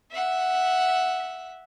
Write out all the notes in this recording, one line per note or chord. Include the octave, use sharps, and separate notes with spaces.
E5 F#5